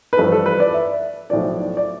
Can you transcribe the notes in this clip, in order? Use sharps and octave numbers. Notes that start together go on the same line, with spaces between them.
B4
A1 G2 F3 A4
A4
B4
D5
E5
B1 A2 F3 D5
D5